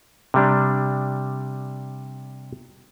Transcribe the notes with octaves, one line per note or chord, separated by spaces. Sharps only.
C3 G3 D4